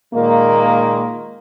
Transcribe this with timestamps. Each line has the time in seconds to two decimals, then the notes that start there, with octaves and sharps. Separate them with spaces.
0.14 A#2 D#3 G#3 A#3